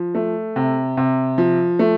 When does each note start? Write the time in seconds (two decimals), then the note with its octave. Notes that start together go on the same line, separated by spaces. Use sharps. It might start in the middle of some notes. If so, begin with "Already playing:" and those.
Already playing: F3
0.15 A3
0.56 C3
0.97 C3
1.38 F3
1.79 A3